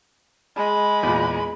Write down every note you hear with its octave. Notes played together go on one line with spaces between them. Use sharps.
G#3 B5
E2 A#2